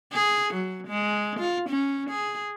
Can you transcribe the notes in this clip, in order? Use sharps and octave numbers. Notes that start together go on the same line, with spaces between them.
G#4
F#3
G#3
F4
C#4
G#4